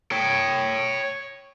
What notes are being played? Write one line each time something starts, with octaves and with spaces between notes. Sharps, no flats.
C#5 G5